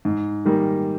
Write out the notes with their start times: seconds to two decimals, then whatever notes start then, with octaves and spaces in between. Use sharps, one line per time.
0.05 G#2
0.45 D#3 G3 A#3